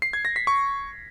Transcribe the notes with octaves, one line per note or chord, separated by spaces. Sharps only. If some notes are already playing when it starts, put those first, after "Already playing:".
C7
G#6
A#6
B6
C#6